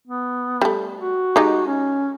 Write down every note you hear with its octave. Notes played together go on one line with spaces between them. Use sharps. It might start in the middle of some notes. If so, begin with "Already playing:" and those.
B3
G3 A3
F#4
G#3 D#4 G4
C#4